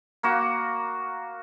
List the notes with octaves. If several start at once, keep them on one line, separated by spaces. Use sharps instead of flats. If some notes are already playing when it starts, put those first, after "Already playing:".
A#3 F#4